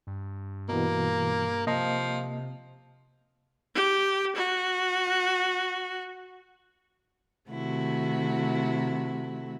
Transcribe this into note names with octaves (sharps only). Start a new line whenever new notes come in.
G2
B2 E3 A#3
C3 F3 A#3 D#5
G4
F#4
C3 D#3 A3 E4 F#4